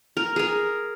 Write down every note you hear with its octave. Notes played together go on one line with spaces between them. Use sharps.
A#4
G#4 A#4